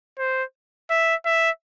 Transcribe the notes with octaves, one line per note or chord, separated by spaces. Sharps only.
C5
E5
E5